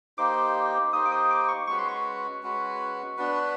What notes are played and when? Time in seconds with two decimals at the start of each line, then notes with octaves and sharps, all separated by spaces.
0.18 A#3 D#4 G4 C5 D6
0.92 A#3 D#4 G4 C5 D#6
1.06 D6
1.12 D#6
1.31 D6
1.49 C#6
1.67 G#3 C#4 F#4 B4 C#6
1.79 C6
1.89 C#6
2.43 G#3 C#4 F#4 B4
3.17 B3 D4 F#4 B4